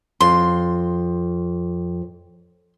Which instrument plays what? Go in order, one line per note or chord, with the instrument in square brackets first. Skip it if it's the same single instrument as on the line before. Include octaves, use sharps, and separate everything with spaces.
[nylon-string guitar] F2 [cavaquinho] C6